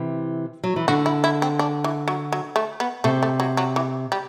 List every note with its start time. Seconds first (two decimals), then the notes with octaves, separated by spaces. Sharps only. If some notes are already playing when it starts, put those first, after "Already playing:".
Already playing: C3 E3
0.64 F#3
0.76 E3
0.88 D3 F#4
1.06 E4
1.24 E4
1.42 C4
1.59 D4
1.84 E3
2.08 F#3
2.32 F#3
2.56 A3
2.80 B3
3.04 C3 A3
3.23 A3
3.40 F#3
3.57 F#3
3.76 E3
4.12 G3